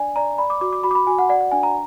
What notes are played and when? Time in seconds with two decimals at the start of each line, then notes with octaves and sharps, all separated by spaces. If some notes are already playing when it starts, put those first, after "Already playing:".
Already playing: D4 D5 G#5
0.16 D5 A#5
0.38 D5 B5
0.50 D6
0.61 F#4 D6
0.73 D6
0.84 F#4 B5
0.91 D6
0.95 B5
1.07 F#4 G#5
1.19 F#5
1.29 D5 F#5
1.41 F#5
1.51 D4 G#5
1.63 A#5